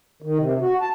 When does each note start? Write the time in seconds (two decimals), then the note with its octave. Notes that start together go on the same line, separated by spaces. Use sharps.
0.22 D#3
0.39 C3
0.61 F#4
0.81 A5